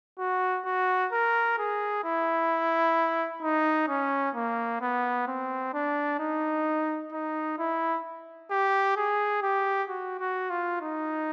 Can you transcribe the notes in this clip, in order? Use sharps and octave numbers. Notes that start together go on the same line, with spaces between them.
F#4
F#4
A#4
G#4
E4
D#4
C#4
A#3
B3
C4
D4
D#4
D#4
E4
G4
G#4
G4
F#4
F#4
F4
D#4